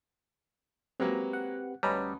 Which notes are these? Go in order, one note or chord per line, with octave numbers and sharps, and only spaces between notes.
F#3 G#3 A#3 C4 G4 B4
F#5
D2 G3 C#4 B4 D#5 A#5